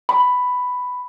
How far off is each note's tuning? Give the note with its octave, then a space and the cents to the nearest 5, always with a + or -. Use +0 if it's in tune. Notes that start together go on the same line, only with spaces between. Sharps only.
B5 +5